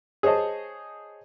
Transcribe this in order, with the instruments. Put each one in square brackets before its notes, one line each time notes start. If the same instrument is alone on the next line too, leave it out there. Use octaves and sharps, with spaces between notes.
[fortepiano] G#4 C5 C#5 D#5 A5